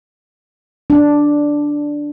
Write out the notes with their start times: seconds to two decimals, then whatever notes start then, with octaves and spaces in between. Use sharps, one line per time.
0.90 D4